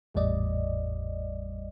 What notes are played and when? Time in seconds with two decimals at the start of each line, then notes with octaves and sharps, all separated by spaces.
0.14 G#1 E2 A2 G3 D5 D#5